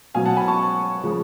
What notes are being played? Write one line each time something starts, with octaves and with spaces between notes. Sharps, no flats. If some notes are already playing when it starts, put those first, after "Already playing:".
B2 F#3 F5 G#5
F#5 A5
G#5 B5
A5 C#6
C#3 F3 G#3